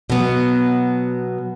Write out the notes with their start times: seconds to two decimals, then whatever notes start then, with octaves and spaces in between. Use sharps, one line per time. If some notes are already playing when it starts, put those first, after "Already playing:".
0.10 B2 F#3 B3